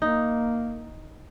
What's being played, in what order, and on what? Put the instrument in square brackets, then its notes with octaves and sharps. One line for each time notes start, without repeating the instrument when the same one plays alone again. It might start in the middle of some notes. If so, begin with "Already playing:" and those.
[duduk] A#3 [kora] D#4